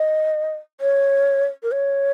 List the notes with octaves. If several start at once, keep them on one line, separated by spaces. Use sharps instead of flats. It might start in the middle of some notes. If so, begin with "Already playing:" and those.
Already playing: D#5
C#5
A#4
C#5